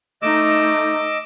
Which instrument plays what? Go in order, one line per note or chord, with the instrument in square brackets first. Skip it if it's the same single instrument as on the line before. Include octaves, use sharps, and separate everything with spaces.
[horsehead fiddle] A3 D#4 [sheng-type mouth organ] D#5 D6 E6